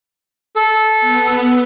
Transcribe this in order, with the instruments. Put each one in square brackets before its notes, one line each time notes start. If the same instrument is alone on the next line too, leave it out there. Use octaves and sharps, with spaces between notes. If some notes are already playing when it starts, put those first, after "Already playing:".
[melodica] A4
[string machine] B3